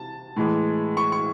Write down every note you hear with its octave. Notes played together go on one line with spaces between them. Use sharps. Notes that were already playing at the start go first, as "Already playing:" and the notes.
Already playing: C3 A5
A2 E3 G#3
C#6
C#6